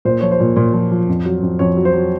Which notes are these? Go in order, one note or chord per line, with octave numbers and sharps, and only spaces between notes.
A#2 C5
F3 C#5
C5
A#2
A#2
F3
F3
F2
F#3
F2
F2 C#5
F#3
C5
F#3